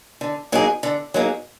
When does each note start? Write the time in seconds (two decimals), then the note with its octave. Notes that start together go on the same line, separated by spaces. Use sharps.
0.21 D3
0.52 F#3 A#3 D#4 G#4
0.83 D3
1.14 F#3 A#3 D#4 G#4